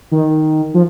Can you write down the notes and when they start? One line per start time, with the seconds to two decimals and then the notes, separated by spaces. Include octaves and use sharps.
0.12 D#3
0.74 F3